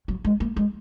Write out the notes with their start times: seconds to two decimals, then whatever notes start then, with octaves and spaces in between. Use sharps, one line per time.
0.08 F#3
0.25 G#3
0.40 A#3
0.56 G#3